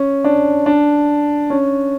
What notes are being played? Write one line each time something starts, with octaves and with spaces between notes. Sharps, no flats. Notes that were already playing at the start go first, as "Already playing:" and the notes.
Already playing: C#4
D4
D4
C#4